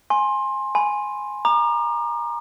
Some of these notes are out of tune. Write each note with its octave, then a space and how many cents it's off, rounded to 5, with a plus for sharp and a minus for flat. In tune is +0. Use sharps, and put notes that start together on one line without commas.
G#5 +0 C6 +20
G#5 +0 B5 +30
A#5 +15 D6 +45